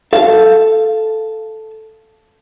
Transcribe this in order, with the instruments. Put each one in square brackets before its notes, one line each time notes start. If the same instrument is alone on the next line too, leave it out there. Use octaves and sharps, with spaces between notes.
[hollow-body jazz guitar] A4 F5